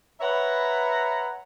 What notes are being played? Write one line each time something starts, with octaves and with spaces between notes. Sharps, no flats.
B4 C#5 E5 F#5 A#5 B5